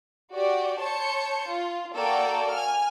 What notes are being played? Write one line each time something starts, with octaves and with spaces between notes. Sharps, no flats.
F#4 G4 D5
C#5 A5 C6 G6 C#7
F4
A#3 F#4 A4 D5 G5
G#5 F6